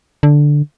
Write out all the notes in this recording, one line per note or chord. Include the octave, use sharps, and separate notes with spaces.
D3